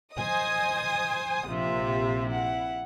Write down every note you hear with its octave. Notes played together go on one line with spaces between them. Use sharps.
C5 D#5 G#5 D#6
A#1 C3 F4 E5
E4 F#5